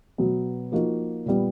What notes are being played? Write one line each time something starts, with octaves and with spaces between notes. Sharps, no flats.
B2 F#3 B3
F3 A#3 D#4 F#4
A#2 G3 B3